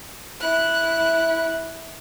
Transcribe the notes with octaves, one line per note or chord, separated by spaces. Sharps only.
E4 F#6